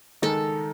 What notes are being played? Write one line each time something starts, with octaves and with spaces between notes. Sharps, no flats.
D#3 G#3 D#4 A4